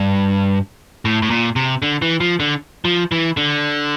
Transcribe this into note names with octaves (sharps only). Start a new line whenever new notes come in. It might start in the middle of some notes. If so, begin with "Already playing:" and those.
Already playing: G2
A2
A2
A#2
C3
D3
E3
F3
D3
F3
E3
D3